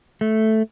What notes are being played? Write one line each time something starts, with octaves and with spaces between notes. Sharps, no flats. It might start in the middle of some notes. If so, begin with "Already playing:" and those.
A3